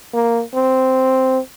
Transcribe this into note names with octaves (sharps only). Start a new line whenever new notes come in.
A#3
C4